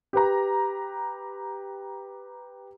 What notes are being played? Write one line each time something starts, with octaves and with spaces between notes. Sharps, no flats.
G4 B4 A#5